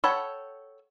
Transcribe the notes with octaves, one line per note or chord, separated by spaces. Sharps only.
A4 C#5 F#5 G5 B5